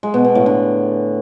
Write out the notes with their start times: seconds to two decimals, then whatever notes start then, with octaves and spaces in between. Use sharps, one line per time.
0.03 G#3
0.14 B2
0.25 B2
0.35 A2
0.46 D3